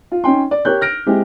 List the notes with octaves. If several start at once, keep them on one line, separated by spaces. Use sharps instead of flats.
F4
C#4 D#4 G5 C6
D5
G4 A#4 C#5 F#6 G6
F6 A#6 D7
G#3 C4 E4 G4